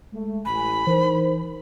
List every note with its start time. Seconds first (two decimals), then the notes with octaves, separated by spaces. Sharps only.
0.13 G#3 A3
0.45 A1 G#5 B5
0.87 E3 D#4 A#4 C5